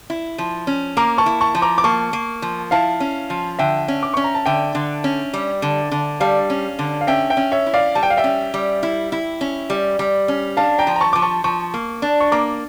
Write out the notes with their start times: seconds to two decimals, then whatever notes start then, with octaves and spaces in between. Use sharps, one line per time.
0.10 E4
0.38 F3
0.67 C#4
0.97 A#3 A#5 D6
1.18 A5 C#6
1.26 E4
1.41 A5 C#6
1.55 F3
1.62 A#5 D6
1.78 D6
1.84 A#3 A5 C#6
2.13 A#3
2.42 F3
2.71 E4 F5 A5
3.00 C#4
3.30 F3
3.59 D3 E5 G5
3.88 C#4
4.03 D6
4.14 C#4 C#6
4.24 A#5
4.35 A5
4.46 D3 E5 G5
4.75 D3
5.04 C#4
5.33 G3
5.62 D3
5.91 D3
6.20 G3 F5 A5
6.50 C#4
6.79 D3
7.01 F5
7.07 C#4 E5 G5
7.30 E5 G5
7.37 C#4
7.52 C#5 E5
7.66 E4
7.74 D5 F5
7.95 G3 A5
8.03 G5
8.10 F5
8.17 E5 G5
8.24 C#4
8.54 G3
8.83 E4
9.12 E4
9.41 C#4
9.70 G3
9.99 G3
10.28 C#4
10.57 D4 F5 A5
10.78 G5 A#5
10.87 F3
10.96 A#5
11.00 A5 C#6
11.13 F3 D6
11.22 A5 C#6
11.44 F3 A5 C#6
11.74 A#3
12.02 D4
12.20 C#6
12.32 A#3 A#5 D6